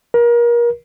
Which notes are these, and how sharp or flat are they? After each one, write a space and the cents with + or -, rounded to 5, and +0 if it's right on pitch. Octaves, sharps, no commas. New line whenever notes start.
A#4 +30